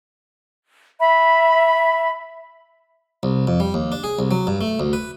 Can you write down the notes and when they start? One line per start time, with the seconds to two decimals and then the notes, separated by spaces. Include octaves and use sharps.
0.99 E5 B5
3.23 C2
3.47 F2
3.60 G3
3.74 D#2
3.92 D4
4.04 G#4
4.19 C2
4.31 F#3
4.47 G2
4.61 A3
4.80 D2
4.93 B4